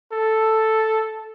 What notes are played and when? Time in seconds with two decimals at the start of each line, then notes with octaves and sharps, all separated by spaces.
0.13 A4